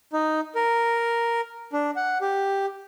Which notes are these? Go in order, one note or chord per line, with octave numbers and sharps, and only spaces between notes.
D#4
A#4
D4
F#5
G4